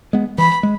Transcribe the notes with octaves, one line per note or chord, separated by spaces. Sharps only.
G#3 B3
E3 B5
G#3